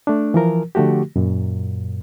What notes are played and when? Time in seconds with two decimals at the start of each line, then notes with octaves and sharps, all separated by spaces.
0.07 A3 D4
0.34 E3 F3 A#4
0.75 D3 F3 A3 F#4 G4
1.16 F#2 A#2